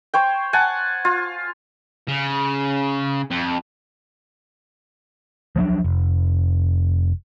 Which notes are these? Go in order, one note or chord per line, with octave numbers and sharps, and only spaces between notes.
C5 C#5 G5
F#5 G#5 A5
F4
C#3
F2
F3 F#3 A#3 D4
F1